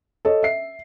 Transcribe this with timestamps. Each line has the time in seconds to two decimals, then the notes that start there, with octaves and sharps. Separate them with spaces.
0.25 A4 C#5 D#5
0.43 E5 C7